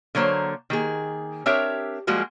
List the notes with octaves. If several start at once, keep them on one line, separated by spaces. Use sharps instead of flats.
D3 F#3 A#3 C5 C#5
D#3 A#3 G#4
C4 D4 G4 A#4 C#5 E5
F3 G3 G#3 A#3 F#4 G#4